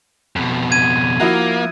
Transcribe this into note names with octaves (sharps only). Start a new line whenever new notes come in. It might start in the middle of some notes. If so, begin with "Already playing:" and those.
F2 B2
G#6 D#7
F3 A#3 E4 F#4